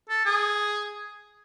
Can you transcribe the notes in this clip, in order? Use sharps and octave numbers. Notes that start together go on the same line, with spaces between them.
A4
G#4